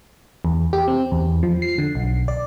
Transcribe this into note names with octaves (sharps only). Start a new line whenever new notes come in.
E2
G4
C4
E2
F3
C7
D3
B1
D5